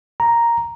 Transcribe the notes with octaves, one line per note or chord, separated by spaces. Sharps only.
A#5